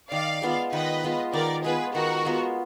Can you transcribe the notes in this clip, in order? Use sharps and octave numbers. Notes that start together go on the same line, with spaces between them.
D#3 D5 F5
G#3 B3 F4
D#3 B4 D#5
G#3 B3 F4
D#3 A#4 D5
G#3 B3 F4 G#4 B4
D#3 F#4 A#4
G#3 B3 F4